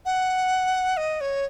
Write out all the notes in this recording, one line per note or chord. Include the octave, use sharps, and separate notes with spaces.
F#5
D#5
C#5